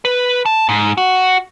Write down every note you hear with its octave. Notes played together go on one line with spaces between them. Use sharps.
B4
A5
G#2
F#4